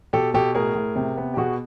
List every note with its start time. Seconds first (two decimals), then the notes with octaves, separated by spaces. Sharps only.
0.13 B2 G4 A4
0.34 B2 G4 A4
0.55 A2 G#4 A#4
0.75 A2
0.96 C3
1.17 B3
1.34 G4
1.37 B2 F#4 G#4